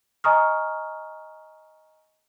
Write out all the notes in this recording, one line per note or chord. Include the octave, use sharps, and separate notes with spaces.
D#5 G#5 A#5 C#6 D#6 F6